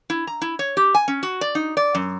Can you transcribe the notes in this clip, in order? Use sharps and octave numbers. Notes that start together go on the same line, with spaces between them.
E4
A#5
E4
C#5
G4
G#5
C#4
F#4
D5
D#4
D5
F#2